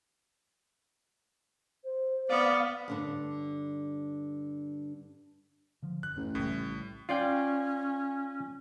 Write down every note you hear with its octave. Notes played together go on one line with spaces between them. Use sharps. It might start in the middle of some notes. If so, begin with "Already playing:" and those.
C5
B3 D5 F5 D#6 F6
G2 D3 D4
D3 F3
F#2 F#6
A1 F#2
A#1 A2 C#3 G3
C#4 F4 D5 G5